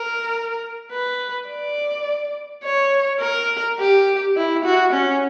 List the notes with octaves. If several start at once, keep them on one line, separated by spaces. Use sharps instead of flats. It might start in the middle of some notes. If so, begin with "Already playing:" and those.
Already playing: A#4
B4
D5
C#5
A#4
G4
E4
F#4
C#4